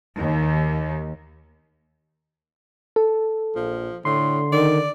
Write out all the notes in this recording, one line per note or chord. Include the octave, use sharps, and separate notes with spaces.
D#2
A4
A#1 F3
A2 D3 C6
D#3 D5